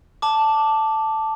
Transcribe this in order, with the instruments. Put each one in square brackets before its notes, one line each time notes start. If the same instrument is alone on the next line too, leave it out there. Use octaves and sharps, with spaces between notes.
[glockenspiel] A5 D6